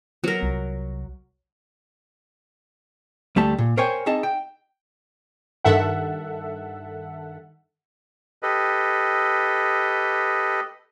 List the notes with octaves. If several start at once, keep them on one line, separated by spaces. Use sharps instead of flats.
F#3 B3 A#4
C2
D2 G3 A3 A5
A#2
A#4 C5 C#5 G5 G#5
C4 D#4 G#4 D#5 A5
G5
G2 D#3 A4 E5 F#5
G4 A4 B4 D#5